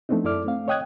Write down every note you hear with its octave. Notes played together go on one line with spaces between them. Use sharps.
F3 A3 B3 C4 D4 D#4
F#2 E4 A4 D5 D6 F6
A3 C4 F5
C#5 D#5 G5 D#6 F#6 G#6